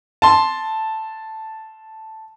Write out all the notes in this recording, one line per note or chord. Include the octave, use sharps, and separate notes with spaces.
A5 C6